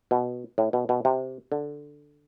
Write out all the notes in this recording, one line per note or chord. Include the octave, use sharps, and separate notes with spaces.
B2
A2
B2
B2
C3
D3